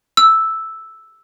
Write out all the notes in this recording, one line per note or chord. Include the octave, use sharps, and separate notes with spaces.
E6